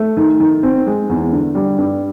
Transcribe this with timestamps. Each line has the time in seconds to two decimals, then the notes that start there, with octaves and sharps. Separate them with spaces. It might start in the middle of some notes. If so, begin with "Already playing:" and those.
Already playing: A3
0.17 D#3
0.40 D#3
0.63 C4
0.86 G#3
1.09 E2
1.32 D3
1.55 G3
1.78 G2